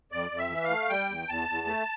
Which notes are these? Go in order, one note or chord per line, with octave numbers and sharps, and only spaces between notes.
F2 D5
F2
E5
E3
F5
A3
G3 G5
E2
E2 A5
E2
A3